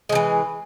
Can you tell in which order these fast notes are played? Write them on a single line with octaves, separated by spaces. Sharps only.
G#3 F3 E3